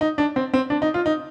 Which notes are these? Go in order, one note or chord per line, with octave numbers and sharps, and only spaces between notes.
D#4
D4
C4
C4
D4
D#4
F4
D#4